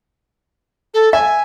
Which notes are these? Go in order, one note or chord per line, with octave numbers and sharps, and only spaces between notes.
A4
E5 G#5